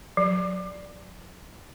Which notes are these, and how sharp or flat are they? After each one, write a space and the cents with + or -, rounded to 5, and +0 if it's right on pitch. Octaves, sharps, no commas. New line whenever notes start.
F#3 -25